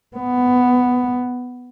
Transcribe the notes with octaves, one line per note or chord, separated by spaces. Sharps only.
B3